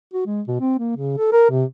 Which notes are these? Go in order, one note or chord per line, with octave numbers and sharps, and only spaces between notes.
F#4
G#3
B2
C4
A#3
C#3
A4
A#4
C3